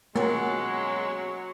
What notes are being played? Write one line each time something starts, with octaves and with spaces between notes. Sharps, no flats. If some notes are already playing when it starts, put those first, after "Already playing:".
B2 F#3 G#3 A#3 C#4